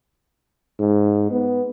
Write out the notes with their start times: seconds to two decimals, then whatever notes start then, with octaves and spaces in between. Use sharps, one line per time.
0.80 G#2
1.31 B3